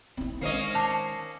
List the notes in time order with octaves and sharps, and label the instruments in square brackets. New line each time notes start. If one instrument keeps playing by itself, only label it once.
[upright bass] C4 E4
[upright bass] D#3 G#3 [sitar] A#3 C#4 D#5 [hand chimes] C5 C7 C#7
[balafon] A5 [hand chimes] D6 C7 C#7